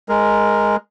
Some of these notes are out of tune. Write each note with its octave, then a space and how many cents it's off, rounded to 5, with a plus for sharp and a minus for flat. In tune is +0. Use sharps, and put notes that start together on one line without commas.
G#3 +0 A#4 +0